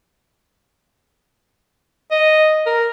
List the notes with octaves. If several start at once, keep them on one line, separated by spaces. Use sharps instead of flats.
D#5
A#4